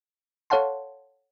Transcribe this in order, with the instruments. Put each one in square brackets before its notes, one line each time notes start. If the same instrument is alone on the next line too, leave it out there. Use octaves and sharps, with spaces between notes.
[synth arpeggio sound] A4 C#5 F5 F#5 A5 C6